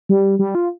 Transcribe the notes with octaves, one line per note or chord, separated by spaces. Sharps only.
G3
G3
F4